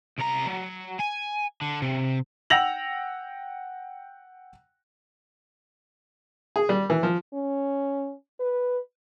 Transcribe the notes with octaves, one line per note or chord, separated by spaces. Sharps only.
C2 A#5
F#3
G#5
D3
C3
F#5 G5 E6 A#6 F7 F#7
G#4
G3
E3
F3
C#4
B4